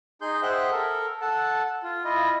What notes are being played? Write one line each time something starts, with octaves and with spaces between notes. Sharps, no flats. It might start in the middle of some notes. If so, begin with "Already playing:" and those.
D#4 G#4 C6 G6
G#4 C5 E5 F#5 G5 F#6
A4 A#4
A4 F#5 A5
F4
E4 F4 D#5